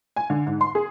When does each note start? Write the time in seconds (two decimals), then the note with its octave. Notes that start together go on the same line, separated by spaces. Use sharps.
0.16 G#5
0.30 D3
0.46 G#2
0.61 C6
0.75 G#4